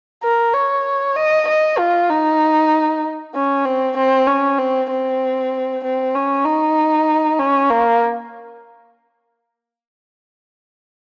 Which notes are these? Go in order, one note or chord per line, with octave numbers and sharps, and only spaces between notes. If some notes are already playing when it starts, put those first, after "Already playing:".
A#4
C#5
D#5
D#5
F4
D#4
C#4
C4
C4
C#4
C4
C4
C4
C#4
D#4
C#4
A#3